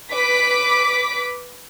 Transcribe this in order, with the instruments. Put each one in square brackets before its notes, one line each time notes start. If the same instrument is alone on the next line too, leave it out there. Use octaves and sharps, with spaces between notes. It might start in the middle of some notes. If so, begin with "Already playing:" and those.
[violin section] B4 D6 B6